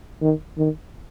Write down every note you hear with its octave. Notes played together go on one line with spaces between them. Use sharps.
D#3
D#3